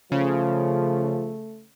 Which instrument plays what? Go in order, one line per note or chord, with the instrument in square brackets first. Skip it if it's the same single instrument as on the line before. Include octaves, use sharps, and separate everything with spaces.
[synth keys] C#3 [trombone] F3 [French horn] A3